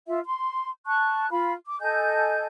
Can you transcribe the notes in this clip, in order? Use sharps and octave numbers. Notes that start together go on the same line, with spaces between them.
F4 E5
C6
A5 C#6 F#6
F4 F5 B5
D6
A4 D#5 G#5 G6